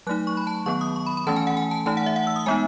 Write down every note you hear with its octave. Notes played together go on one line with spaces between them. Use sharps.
F#3 A3 D#4 F#6
C#6
B5
A5
D#3 F#3 B3 C#6
D#6
C#6
B5
B5
E3 A3 C#4 A5
G#5
F#5
G#5
A5
E3 A3 D#4 A5
F#5
E5
F#5
E6
D#6
G#3 B3 D#4 G#5